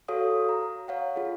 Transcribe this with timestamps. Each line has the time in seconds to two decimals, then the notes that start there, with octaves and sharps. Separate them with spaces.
0.08 F#4 A4 C#5 F5 D#6
0.49 A#5
0.88 C#5 F5 F#5
1.16 F4 G#4